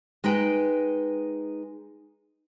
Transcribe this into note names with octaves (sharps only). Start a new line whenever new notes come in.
G#3 D#4 B4 G5